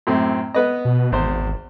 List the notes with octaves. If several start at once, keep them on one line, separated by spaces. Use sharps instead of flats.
F#2 A2 C4
B3 B4 D#5
B2
G#1 E2 C5